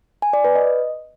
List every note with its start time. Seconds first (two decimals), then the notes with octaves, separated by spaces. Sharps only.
0.22 G#5
0.33 D5
0.44 B4
0.55 D#5